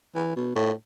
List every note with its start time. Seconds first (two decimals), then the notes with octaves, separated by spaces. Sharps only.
0.15 E3
0.36 B2
0.55 A2